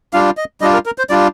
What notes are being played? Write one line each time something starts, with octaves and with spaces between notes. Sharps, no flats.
G3 D4 F4 F5
D#5
G3 D4 F4 D#5
A#4
A#4
C5
G3 D4 F4 D5